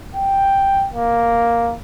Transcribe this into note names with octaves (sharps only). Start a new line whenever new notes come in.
G5
A#3